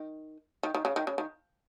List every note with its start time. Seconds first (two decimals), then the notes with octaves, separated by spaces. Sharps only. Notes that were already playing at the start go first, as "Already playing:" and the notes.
Already playing: D#3
0.63 D#3
0.75 D#3
0.85 C#3
0.96 D#3
1.07 C#3
1.18 D#3